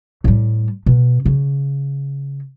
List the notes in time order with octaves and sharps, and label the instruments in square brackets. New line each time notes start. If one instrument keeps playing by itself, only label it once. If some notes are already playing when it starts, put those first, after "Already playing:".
[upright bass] A2 G3
B2
C#3